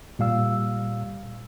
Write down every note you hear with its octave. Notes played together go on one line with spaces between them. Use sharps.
A#2 G3 F5 E6